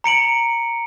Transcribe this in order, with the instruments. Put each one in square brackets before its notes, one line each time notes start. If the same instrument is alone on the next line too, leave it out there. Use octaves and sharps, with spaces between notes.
[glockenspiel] A#5 C#7 D7 F#7